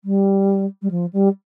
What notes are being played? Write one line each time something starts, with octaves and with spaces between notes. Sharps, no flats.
G3
G3
F3
G3